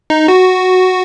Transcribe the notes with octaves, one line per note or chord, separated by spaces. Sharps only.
D#4
F#4